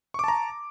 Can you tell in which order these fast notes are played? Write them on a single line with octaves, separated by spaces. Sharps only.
C#6 D6 A5 A#5